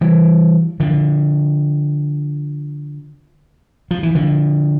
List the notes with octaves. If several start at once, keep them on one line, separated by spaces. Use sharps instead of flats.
E3 G3
D3 F3
F3
E3
D3 F3